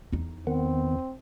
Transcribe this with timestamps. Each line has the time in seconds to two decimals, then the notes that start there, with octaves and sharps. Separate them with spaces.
0.13 E2 D#4
0.47 D#3 B3 C4